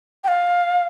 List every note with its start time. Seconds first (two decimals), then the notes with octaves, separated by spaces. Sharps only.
0.24 G5
0.28 F5